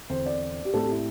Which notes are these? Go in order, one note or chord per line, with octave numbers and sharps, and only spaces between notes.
E2 D3 C4 C5
D5
G4
A2 A3 C4 A4
G4
E4